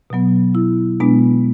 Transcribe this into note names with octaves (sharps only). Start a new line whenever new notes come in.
B2 F#3 B3
E4
B2 G#3 B3 D4